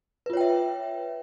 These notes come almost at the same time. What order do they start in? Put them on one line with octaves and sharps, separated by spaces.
B4 F4 C#5 G5 E5